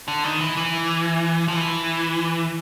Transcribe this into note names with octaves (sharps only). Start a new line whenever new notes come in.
D3
D#3
E3
E3
F3
E3